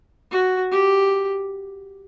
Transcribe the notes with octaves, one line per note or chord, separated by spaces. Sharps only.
F#4
G4